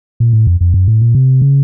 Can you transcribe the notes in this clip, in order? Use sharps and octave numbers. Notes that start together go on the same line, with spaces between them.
A#2
A2
F2
F2
F#2
A2
A#2
C3
C#3